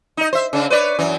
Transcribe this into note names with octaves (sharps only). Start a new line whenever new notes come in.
D#4 D#5
C5 E5
C#3 D4
B4 C#5 D5
F#2 E3